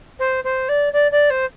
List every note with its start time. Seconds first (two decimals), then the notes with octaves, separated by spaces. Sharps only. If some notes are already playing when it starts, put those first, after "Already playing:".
0.19 C5
0.44 C5
0.69 D5
0.93 D5
1.12 D5
1.30 C5